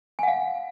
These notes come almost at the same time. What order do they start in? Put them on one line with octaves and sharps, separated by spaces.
G#5 F#5 F5